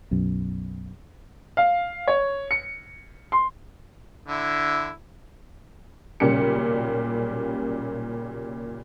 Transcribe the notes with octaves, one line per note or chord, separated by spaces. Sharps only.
B1 F#2
F5
C#5
C#7
C6
D3 E4
B1 A#2 C#3 G3 G4 C#7